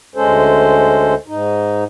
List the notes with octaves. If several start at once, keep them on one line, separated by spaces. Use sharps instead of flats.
D2 G#3 C#4 A4 C5
G#2 D#4